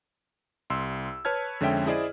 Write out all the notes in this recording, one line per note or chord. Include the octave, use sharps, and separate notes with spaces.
C2 C6 E6
B4 C#5 A5 F6 G#6
F2 D3 G#3 C#4 E5 G5
E4 G#4 C5 D5 D#5 D#6